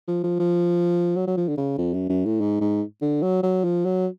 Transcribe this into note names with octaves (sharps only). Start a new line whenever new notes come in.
F3
F3
F3
F#3
F#3
F3
D3
C#3
F2
F#2
F#2
A2
G#2
G#2
D3
F#3
F#3
F3
F#3